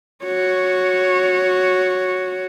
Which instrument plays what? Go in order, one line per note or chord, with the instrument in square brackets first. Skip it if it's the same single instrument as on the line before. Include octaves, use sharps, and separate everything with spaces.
[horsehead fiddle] F#4 C#5